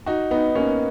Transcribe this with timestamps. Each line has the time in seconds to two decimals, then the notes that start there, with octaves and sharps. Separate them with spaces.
0.06 D#4 F#4
0.31 B3 D#4
0.55 A#3 C#4